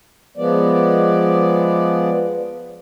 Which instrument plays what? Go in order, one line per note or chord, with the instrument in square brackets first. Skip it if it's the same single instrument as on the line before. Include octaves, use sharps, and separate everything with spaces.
[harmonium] F3 G#3 B3 D5